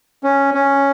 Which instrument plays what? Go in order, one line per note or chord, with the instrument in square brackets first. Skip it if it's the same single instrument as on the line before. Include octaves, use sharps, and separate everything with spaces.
[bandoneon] C#4
C#4